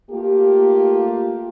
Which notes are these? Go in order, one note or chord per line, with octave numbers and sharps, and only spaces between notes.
A3 A#3 F4 G4